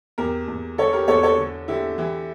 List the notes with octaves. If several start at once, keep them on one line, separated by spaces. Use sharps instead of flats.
E2 G4 A#4
E2
D3 A4 C#5
G4 A#4
E2 A4 C#5
A4 C#5
D3
D3 E4 G4
E3 E4 G4